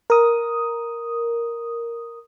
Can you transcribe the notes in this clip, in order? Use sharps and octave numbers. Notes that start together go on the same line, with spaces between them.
A#4 D#6